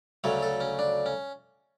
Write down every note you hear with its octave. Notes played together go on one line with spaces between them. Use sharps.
D2 C#3 F#3 A3 C#5
A4
C#4
D4
C#4